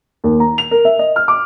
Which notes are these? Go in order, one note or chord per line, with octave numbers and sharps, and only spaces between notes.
D#2
A#5
F7
A#4
E5
D#5
F6
D6